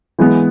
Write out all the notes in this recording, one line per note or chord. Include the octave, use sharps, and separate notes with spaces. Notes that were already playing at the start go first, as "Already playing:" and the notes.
E3 G#3 B3